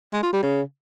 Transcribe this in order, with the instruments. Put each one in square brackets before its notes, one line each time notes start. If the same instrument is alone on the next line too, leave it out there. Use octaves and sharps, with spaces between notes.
[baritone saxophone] G#3
F4
G3
C#3